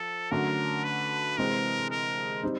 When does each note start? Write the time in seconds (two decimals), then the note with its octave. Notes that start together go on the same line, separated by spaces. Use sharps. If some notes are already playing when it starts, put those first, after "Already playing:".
Already playing: F3 A4
0.31 D3 F#3 A3 C#4 A#4
0.84 B4
1.38 C3 E3 G#3 C4 A#4
1.90 A#4
2.43 G3 C4 D#4